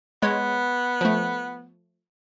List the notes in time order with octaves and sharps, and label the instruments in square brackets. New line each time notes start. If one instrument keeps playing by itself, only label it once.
[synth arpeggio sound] G#3 C#5 [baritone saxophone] B3
[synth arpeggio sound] F3 A3